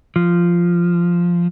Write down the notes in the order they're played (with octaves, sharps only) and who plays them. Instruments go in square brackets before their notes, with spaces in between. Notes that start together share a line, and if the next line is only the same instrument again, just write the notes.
[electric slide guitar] F3